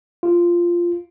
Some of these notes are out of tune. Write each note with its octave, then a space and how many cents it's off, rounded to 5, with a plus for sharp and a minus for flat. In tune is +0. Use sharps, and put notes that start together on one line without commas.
F4 -10